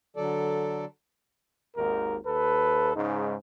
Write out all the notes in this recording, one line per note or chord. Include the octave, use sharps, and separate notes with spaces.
D3 F#3 A4 D5
G#1 D#2 G#2 A#4
D#2 A4 B4
G#2 C#3 G#3 D#4